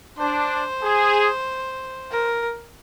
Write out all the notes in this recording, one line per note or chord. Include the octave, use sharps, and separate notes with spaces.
D4 C5
G#4
A#4